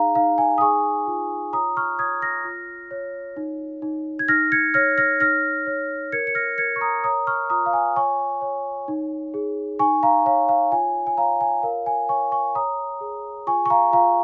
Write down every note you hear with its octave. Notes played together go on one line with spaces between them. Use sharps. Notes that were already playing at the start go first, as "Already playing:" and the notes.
Already playing: D#4 G#4 F5 A#5
D#4 F5
G#5
D#6
G#4 G#5 C#6
F4
C#5 A#5 D#6
C#6 F6
C#5 D#6 G#6
F6 A#6
F4
C#5
D#4
D#4
G#6
D#4 F6 A#6
G#6 C#7
C#5 F6 A#6
F6 A#6
D#4 F6 A#6
C#5
A#4 G#6 C#7
C#7
F6 A#6
A#4 G#6 C#7
C#6
A#5 D#6
C#5 A#5 D#6
C#6 F6
F4 A#5 D#6
F5
G#5
C#5 G#5 C#6
C#5
D#4
G#4
D#4 G#5 C#6
F5 A#5
C#5 F5
F5
F4 G#5
G#5
C#5 F5 A#5
G#5
A#4 F5
G#5
C#5 G#5 C#6
G#5 C#6
C#5 A#5 D#6
G#4
F4 G#5 C#6
C#6
F5 A#5
F4 F5 A#5